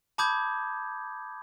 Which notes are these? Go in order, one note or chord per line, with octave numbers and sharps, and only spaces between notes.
A5 B5 D6 D#6 G6 G#6